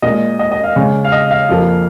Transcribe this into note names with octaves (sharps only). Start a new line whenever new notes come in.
A#2 G#3 D#5
D#5
D#5
F5
C#3 G#3
F5
D#5
F5
F2 F3 A#3